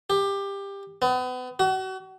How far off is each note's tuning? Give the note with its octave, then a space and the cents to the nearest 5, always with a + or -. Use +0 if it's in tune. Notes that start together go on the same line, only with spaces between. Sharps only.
G4 +20
B3 +35
F#4 +35